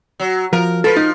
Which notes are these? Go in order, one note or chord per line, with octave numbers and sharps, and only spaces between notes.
F#3
F3 A#4
F3 A4 B4
D#4